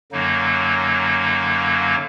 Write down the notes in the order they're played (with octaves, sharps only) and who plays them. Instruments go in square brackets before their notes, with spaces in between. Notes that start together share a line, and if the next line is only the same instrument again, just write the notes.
[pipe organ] F#2 D3 F#3 A#3 D#4